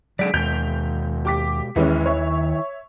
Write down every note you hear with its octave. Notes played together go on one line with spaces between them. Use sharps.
D3 F#3 G#3 G#4 D5 B6 D7
D#2 B2 G#3 G6 F7
G4 D6 B6
D#2 D#3 E3 G#3 C#4 E4
C#5 E5